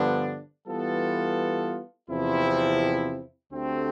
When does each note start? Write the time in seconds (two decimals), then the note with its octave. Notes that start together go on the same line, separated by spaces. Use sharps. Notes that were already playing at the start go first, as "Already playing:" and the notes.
Already playing: G2 D3 F3 B3 D4
0.67 E3 G3 B3 F4 A4
2.09 E2 C3 F3 C4 E4
3.51 D2 D3 A3 C4 G4